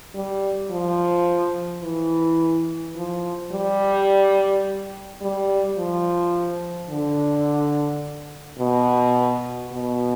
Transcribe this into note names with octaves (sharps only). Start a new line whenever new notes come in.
G3
F3
E3
F3
G3
G3
F3
D3
B2
B2